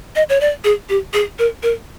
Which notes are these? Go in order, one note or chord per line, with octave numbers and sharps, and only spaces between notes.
D#5
C#5
D5
G#4
G4
G#4
A#4
A#4